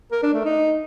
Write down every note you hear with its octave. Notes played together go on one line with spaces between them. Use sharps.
A#4
D4
A3
D#4